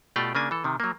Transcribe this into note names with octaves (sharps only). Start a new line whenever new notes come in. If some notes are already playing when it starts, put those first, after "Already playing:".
B2 A3 F4 G4 D5 G5
C#3 A#3 D4 G#5
E3 A4
C3 D#3
F#3 A#3